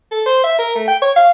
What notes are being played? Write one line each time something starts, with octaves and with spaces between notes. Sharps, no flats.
A4
C5
E5
A#4
A3
G5
C#5
F5